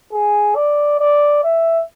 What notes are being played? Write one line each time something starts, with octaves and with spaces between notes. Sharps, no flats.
G#4
D5
D5
E5